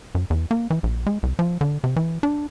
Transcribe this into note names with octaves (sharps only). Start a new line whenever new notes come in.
F#2
E2
A#3
E3
A#1
G#3
C2
F3
D3
C3
E3
D4